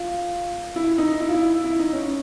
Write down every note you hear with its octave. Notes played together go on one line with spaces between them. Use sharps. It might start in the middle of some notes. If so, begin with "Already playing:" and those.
Already playing: F4
E4
D#4
E4
F4
E4
E4
D#4
C#4